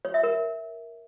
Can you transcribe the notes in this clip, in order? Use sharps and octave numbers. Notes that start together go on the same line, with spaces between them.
C#5
E5
A#4